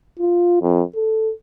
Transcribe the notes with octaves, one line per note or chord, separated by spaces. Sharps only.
F4
F2
A4